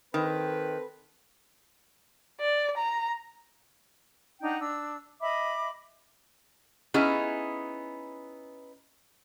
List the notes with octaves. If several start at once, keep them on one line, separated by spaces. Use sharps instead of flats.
D#3 C4 A4 B4
D5
A#5
D4 D#4 F#5 G5
D4 E6
D#5 E5 B5 D6
B3 C#4 D#4 E4 G#4